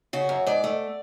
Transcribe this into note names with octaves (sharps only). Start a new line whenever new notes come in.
C#3 F#4
F#2
G#2 D5
A3